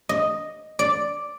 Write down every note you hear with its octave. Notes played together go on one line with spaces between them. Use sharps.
D#5
D5